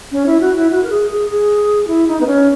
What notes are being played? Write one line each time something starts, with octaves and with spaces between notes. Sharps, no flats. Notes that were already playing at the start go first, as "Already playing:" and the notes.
C#4
E4
F#4
E4
F#4
A#4
G#4
G#4
G#4
E4
D#4
B3
C#4